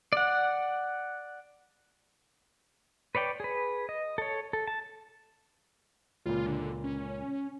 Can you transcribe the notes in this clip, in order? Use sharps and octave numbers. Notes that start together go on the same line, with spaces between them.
D5 F#5
B4 C#5 D5 G5
G#4 B4
D#5
A4 C#5
A4
A5
C#2 A#2 F4
D3
C#4